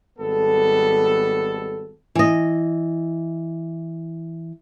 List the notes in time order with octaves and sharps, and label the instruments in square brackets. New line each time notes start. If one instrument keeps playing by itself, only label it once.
[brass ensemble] G#1 G3 B3 A4
[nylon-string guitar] E3 D#5